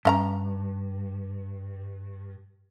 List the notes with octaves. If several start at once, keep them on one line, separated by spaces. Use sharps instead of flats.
G2 C#4 F5 A#5